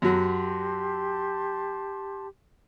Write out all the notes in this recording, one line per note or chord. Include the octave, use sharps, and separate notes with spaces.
F#2 F#3 G4 A5 C6